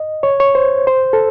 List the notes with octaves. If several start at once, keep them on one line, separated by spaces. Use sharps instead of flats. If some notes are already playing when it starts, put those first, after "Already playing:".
Already playing: D#5
C#5
C#5
C5
C5
A4